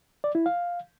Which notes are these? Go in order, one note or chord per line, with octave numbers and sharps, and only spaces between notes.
D5
E4
F5